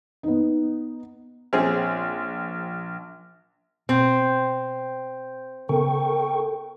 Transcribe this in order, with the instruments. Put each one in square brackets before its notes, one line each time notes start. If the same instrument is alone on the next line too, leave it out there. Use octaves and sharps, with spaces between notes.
[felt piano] B3 D#4
[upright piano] A#1 [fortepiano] C4 C#4 G#4
[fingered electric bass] B2 [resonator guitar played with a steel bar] C4
[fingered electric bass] C#3 B3 [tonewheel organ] A4 G5 C#6 [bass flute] A#4